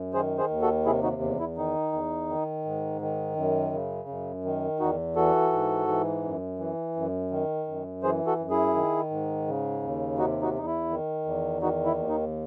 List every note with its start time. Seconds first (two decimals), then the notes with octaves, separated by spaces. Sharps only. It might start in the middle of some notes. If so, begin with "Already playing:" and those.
Already playing: F#2
0.14 D#3 G#4 C5
0.38 G#4 C5
0.50 D#2
0.62 F#4 A4
0.86 C3 E4 G#4
1.03 D#4 F#4
1.22 E2
1.40 E4
1.57 D#3 D#4
1.93 E2
2.29 D#3
2.65 G#2
3.01 D#3
3.36 F#2
3.73 C#3
4.09 F#2
4.44 D#3
4.80 E2 D#4 F#4
5.16 E3 F#4 A4
5.52 G#2
5.88 E3
6.23 F#2
6.59 E3
6.96 F#2
7.31 D#3
7.68 F#2
8.03 E3 G#4 C5
8.27 F#4 A4
8.39 F#2
8.50 E4 G#4
8.75 D#3
9.10 G#2
9.47 C#3
9.83 D#2
10.18 C3 D#4 F#4
10.42 D#4 F#4
10.54 E2 D#4
10.66 E4
10.90 D#3
11.25 E2
11.62 D#3 D#4 F#4
11.85 E4
11.98 D#2
12.09 D#4